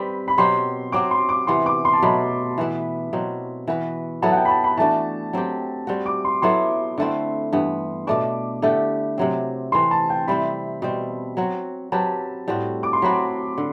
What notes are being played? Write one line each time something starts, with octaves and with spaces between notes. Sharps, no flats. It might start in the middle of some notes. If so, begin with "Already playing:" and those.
Already playing: G3 C4 G4 B4 B5
B5
B2 F#3 C4 G4 C6
F#3 C4 F#4 D6
C6
D6
C3 E3 B3 C6
D6
C6
A5
B2 F#3 A3 B5
E3 B3 E4 B4
B2 F#3 C4
E3 B3 F#4 B4
F#3 B3 E4 A4 A5
F#5
G5
B5
A5
B5
E3 A3 D4 F#4 A5
F#3 C4 G4
G3 C4 F#4
D6
C6
F#3 B3 E4 A4 C6
D3 A3 C4 E4
G2 E3 B3
B2 A3 D4 D6
D3 A3 E4 G4
C3 F#3 C4
E3 A3 C4 C6
A5
G5
C3 G3 C4 E4 B5
B2 G3 C4
F#3 C4 F#4
F#3 C4 G4 B4 A5
A2 G3 C4 F#4
D6
C6
F#3 C4 F#4 B5
D3